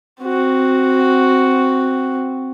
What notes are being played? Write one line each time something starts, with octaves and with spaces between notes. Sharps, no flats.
C4 F#4